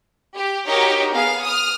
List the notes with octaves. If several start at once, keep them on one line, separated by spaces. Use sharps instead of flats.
G4
D#4 F#4 G4 A#4 C#5
B3 G#4 F5
D#6 F6